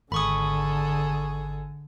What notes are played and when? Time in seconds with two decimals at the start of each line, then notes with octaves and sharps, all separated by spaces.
0.12 G#1 D3 G#4 A4 B5 C#6 D#6